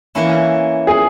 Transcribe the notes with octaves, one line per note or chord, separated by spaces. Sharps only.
E3 A#3 C#4 E4
G#4